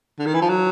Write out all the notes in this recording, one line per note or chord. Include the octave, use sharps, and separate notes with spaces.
D3
D#3
E3
F3
F#3